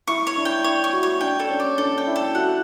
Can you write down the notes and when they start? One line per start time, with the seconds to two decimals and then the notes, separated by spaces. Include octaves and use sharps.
0.07 E4 C#6
0.27 C#5
0.36 D4
0.45 G5
0.64 E4 C#5
0.84 C#6
0.93 F#4
1.03 C#5
1.21 D4 G5
1.40 A4
1.50 C#4
1.60 D5
1.78 D4 A4
1.98 G5
2.07 E4
2.16 A4
2.35 F#4 F#5